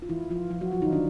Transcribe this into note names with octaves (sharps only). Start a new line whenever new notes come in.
F4
E3 E4
F3 F4
F3 F4
F#3 F#4
F3 F4
D#3 D#4
D3 D4